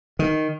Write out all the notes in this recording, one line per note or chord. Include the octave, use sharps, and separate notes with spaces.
D#3